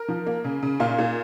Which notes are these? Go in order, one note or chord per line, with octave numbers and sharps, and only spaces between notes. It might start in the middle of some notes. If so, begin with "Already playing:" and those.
Already playing: A#4
F3
A#3
C#3
C#3
A#2 F5
A#2